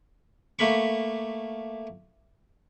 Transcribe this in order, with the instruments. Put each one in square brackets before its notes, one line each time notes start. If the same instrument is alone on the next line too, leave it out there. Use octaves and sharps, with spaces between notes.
[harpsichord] A3 A#3 B5 C#6